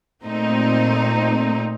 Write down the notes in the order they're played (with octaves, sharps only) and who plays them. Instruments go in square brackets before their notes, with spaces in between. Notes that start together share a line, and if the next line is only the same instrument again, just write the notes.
[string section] A#2 A3 C4 D#4